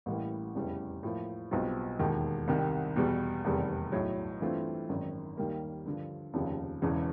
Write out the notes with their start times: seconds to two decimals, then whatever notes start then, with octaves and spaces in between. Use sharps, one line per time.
0.06 A1 A2 E3 G3 A#3
0.55 F1 E2 C#3 E3 G3
1.03 A2 F3 A#3
1.51 B1 B2 G3 C4 F4
1.99 E1 D#2 D#3
2.48 C2 C3 D#3 G3
2.96 E2 B2 G3
3.45 F1 E2 C3 D#3 G3
3.92 B1 A2 F#3
4.40 G2 E3 A3 C4 F4
4.89 G#1 F#2 D#3
5.37 D#2 D#3 G3 A#3
5.86 G2 D3 F3
6.34 F1 D#2 C#3 F3
6.82 E1 E2 C#3 E3